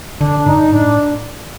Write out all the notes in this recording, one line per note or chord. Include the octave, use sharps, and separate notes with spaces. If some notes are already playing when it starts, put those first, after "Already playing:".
D3 D4
D4
G2 D#4
A2 D4